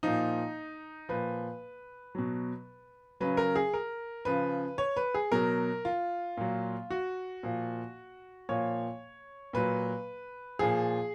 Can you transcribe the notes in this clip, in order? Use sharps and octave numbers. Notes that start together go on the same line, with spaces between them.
A#2 F3 D#4
A#2 F3 B4
B2 F#3
C#3 F#3 B4
A#4
G#4
A#4
C#3 F3 B4
C#5
B4
G#4
B2 F#3 A#4
F4
A#2 F#3
F#4
A#2 F3
A#2 F3 C#5
A#2 F#3 B4
A#2 F3 G#4